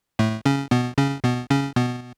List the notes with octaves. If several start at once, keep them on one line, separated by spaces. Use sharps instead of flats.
A2 A3
C#3 C#4
B2 B3
C#3 C#4
B2 B3
C#3 C#4
B2 B3